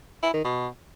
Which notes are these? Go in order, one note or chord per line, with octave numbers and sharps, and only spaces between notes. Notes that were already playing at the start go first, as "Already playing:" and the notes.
E4
D#3
B2